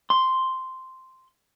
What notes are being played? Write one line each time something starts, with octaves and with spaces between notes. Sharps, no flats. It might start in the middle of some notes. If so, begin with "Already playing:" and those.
C6